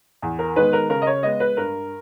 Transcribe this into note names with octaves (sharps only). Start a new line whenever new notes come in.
E2
A#4
D#3 G#3 B3 B4
A#4
C#3 A#4
D#5
C#5
G#3 B3 D#5
B4
G2 A#4